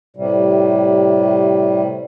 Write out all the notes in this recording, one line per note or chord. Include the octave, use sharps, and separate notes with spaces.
A2 C3 G3